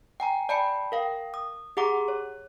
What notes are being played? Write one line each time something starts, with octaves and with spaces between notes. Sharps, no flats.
G5 G#5 A#5
D5 G5 A5 B5 C#7
A#4 F5 G5
D#6
G4 G#4 F#5 A#5 D6
C#5